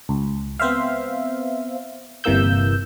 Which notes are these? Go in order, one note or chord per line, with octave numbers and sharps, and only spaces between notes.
C#2
B3 C4 C5 E5 F5
G1 C3 E3 A#3 E6 G6